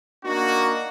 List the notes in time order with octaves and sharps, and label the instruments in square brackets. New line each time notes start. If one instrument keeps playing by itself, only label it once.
[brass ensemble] A#3 D4 D#4 F#4